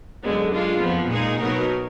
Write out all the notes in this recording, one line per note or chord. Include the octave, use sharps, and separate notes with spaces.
F#2 D3 G#3 B3
G#3 D4 F4
F2 F3 B3
A#2 G#3 D#4 G#4
B2 F#3 B3 D#4 A#4